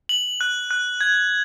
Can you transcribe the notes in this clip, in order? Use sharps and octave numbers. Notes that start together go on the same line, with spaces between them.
F#7
F#6
F#6
G#6